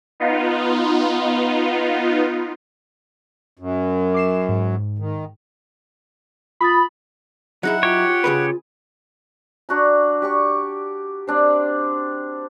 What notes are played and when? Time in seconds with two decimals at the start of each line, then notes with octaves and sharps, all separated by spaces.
0.20 B3 D#4 F4
3.59 F#2
4.14 D6 C7 E7
4.49 G#2
4.99 D#3
6.61 F4 B5 D#6 A6
7.63 F#3 D#4 E4 G#4 F#5
7.83 F4 G4 C#5
8.24 C#3 G#4 B4
9.69 D4 F#4 A#5
10.22 G4 D5 C#6
11.27 C4 D4 C5